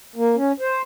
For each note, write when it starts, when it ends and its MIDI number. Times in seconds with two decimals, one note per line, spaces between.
0.16 0.36 58
0.36 0.52 61
0.60 0.82 72